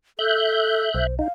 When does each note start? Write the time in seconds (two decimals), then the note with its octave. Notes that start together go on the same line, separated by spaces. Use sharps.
0.19 A4 E5 F#6 G6
0.95 B1 C5
1.19 D#4 F5